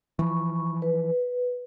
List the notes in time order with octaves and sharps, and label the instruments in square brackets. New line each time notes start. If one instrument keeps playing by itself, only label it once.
[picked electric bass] E3 F3 [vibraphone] B5 C#6
[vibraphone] B4